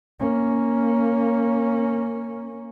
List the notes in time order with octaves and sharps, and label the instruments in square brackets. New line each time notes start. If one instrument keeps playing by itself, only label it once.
[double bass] A#3 C#4